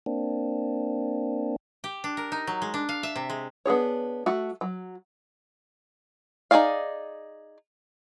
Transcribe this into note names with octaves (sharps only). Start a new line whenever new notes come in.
A#3 C4 D4
G4
D4
A#4
D#4
F#3
G#3
D4
F5
E5
C3
G#3
B3 D4 G#4 C#5
A3 F#4
F#3
D#4 F#4 G#4 D5 F5